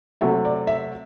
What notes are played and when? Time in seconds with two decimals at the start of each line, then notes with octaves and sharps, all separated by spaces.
0.21 C3 F#3 A3 E5
0.45 D5
0.67 E5